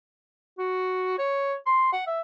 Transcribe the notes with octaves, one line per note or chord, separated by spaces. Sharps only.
F#4
C#5
C6
F#5
E5